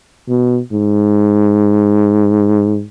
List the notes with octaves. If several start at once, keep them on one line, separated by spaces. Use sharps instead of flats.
B2
G#2